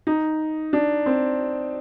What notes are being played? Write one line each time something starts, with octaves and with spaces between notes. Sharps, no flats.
D#4
D4
C4